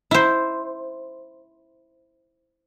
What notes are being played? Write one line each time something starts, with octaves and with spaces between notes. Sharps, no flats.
E4 C5